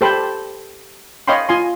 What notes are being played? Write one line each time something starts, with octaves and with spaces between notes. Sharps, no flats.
G4 A4 C5 G5 A5 B5
C#5 D#5 F5 G5 B5 C6
F4 G#5 C6